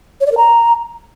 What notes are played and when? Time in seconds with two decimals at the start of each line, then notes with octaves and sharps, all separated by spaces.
0.21 C#5
0.26 D5
0.32 A#4
0.37 A#5